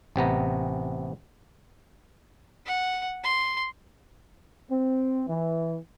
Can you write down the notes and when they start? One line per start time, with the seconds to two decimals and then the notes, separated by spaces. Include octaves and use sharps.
0.16 A1 C3 B3 A#5
2.66 F#5
3.23 C6
4.70 C4
5.28 E3